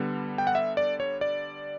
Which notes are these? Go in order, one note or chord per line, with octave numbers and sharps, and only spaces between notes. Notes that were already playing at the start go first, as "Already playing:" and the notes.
Already playing: D3 G3 B3
G5
F#5
E5
D5
C#5
D5